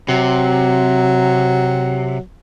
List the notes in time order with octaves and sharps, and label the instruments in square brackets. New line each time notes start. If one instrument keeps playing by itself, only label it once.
[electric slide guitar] C3 [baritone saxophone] F#3